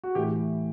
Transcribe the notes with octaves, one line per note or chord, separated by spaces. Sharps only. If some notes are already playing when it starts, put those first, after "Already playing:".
F#4
A2 E3 G4